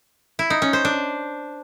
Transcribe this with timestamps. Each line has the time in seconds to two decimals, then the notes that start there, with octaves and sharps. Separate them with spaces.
0.39 E4
0.50 D#4
0.62 C#4
0.73 C5
0.85 D4